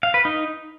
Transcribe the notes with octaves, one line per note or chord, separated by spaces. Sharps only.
F5
B4
D#4